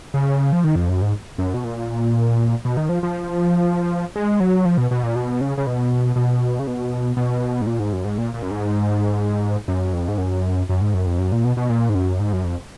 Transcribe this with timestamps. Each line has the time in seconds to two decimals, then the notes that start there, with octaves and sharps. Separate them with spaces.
0.14 C#3
0.52 F3
0.64 D#3
0.76 F2
0.89 F#2
1.02 G#2
1.38 F#2
1.54 B2
1.64 A#2
2.65 B2
2.77 D#3
2.89 F3
3.03 F3
4.16 G#3
4.40 F#3
4.65 F3
4.78 B2
4.91 B2
5.03 A#2
5.16 B2
5.41 C#3
5.58 C#3
5.67 B2
6.16 B2
6.59 C#3
6.67 B2
7.17 B2
7.62 G#2
7.67 A#2
7.80 G#2
7.93 F#2
8.05 G#2
8.18 A#2
8.34 A#2
8.42 F#2
8.51 G#2
9.68 F#2
9.93 F2
10.08 G#2
10.18 F#2
10.69 F#2
10.81 G#2
10.94 F#2
11.06 F2
11.18 F#2
11.32 A#2
11.45 B2
11.57 B2
11.69 A#2
11.89 G#2
11.95 F#2
12.20 G#2
12.33 F#2
12.44 F2